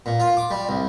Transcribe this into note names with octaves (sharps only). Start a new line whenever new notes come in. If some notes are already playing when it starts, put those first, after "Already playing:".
A#2
F4
D6
G3
C2